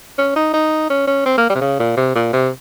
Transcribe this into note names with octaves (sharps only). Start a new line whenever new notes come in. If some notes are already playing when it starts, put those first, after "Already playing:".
C#4
D#4
D#4
C#4
C#4
C4
A#3
G3
C3
C#3
A#2
C3
A#2
C3